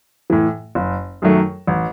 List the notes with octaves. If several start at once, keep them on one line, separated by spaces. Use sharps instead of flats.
A2 E3
F#1
F#2 D#3 F#3 A3
A1